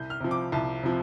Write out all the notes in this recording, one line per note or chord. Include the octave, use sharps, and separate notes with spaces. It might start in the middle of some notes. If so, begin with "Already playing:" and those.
Already playing: C2 G6
F6
C3 F3
D6
C2 A5
C3 F3